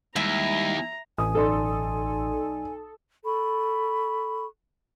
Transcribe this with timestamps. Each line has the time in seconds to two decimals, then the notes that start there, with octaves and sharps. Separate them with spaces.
0.16 D#2 G3 G#3 E4 A#5
1.18 A1 G#5 D#6
1.35 B1 A4 D5 C6
3.24 A4 B5 C#6